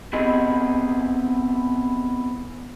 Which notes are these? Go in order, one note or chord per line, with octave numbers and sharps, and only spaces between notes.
B3 C4 E4 G4 G#4 D#5